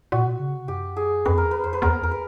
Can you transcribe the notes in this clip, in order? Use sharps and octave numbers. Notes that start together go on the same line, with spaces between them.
A#2 F#4
B2
C#3
C3
F#2 G4
G#4
F2 B4
A#4
E2
B4
F2 C5
B4
E2 A#4
F2 A#4
B4